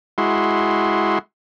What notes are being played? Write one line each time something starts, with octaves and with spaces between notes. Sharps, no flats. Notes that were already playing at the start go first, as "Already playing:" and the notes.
G#3 E4 F#4 C6